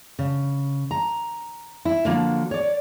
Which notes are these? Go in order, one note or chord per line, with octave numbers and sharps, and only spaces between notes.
C#3
A#5
E4
D3 F3 F#3 A#3
C#5 D5